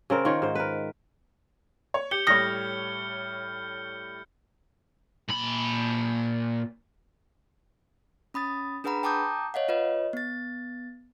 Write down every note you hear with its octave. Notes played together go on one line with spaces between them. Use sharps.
C#3 C4 A#4
D#3 F4 C#5
G#2 C5
A#4 B4
C#5
G4 G6 C#7 G7
A2 G3 C#5 D#6 F6 A#6
A#2 B5
C#4 B5 D#6 A6
D4 G#4 B4 F#5 A#5 B5
G5 A5 A#5 D6 D#6 G6
C#5 D#5 F5 F#5
F4 B4 C#5 D#5
B3 A6